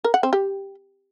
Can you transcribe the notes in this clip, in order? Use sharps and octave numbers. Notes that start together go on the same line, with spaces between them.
A#4
F#5
C4
G4